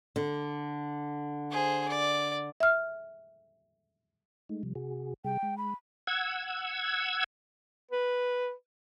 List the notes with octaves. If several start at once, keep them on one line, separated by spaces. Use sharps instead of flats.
D3
G#4 C5
D5
E5 F6
G#3 A3 D#4
C3 F3 G3
C3 F#4 G#4
C3 G3 G#4 G5
G#3
B5
F#5 E6 G#6
B4